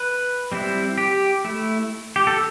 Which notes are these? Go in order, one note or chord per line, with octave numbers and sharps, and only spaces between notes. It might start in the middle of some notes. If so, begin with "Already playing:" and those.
Already playing: B4
G3 C4 E4
G4
A3 E4
G4
A4